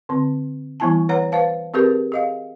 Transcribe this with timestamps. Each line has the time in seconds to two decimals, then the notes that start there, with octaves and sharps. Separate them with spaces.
0.09 D3 C4
0.80 E3 G3 B3 E4 G#5 A5
1.09 B4 C#5 F#5 A#5
1.32 B4 C5 F5 A5
1.74 C4 G4 G#4 A#4 B4
2.12 G#4 D#5 F5